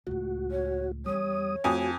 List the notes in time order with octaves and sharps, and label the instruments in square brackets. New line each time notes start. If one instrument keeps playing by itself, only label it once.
[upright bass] C#2 A2 [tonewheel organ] F#4
[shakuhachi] C#5
[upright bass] E2 [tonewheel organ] G3 D#6 [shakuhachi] C#5
[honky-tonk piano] F2 G#5 D#6 [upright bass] A3 [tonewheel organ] F#4